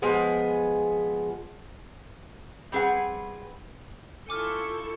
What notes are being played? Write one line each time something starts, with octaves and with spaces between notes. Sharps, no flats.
F3 G#3 B3 G#4
G3 C4 G#4 B4 F#5
E4 F4 A4 G#5 C#6 D6 F6 G6